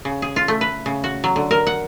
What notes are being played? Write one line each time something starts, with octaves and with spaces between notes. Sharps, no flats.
C#3
G#4
F4
A3
B4
C#3
F#4
F#3
D3
A#4
F#5